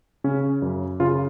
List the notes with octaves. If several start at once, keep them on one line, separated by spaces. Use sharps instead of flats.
C#3 C#4
F#2
C#3 F4